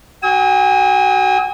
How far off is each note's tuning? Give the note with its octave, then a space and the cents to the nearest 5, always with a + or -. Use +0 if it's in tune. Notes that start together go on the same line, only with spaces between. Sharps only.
F#4 +25 G#5 -35 D#6 +45